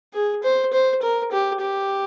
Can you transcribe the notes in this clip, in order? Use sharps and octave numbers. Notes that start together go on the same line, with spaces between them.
G#4
C5
C5
A#4
G4
G4